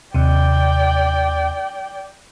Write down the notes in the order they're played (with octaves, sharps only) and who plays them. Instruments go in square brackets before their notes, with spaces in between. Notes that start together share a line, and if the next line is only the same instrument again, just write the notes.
[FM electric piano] D#2 C3 [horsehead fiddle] D5 G5